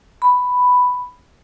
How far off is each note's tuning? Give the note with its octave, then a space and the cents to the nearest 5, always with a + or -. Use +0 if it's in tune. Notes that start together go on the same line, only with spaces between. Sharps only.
B5 +5